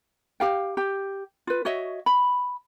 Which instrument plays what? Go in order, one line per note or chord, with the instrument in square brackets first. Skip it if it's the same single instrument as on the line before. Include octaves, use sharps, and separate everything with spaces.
[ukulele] G4 F5 G5
G4
F4 B4
F#4 C#5 D#5 E5
B5